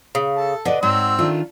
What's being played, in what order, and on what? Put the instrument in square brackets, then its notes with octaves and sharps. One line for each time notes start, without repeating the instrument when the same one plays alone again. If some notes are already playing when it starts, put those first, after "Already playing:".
[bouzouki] C#3
[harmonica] A4 A5
[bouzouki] D3 [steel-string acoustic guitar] B4 D5 D#5
[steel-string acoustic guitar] G#2 [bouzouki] F#3 [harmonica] C4 C6 E6
[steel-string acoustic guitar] D#3 D4 F4 [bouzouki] A3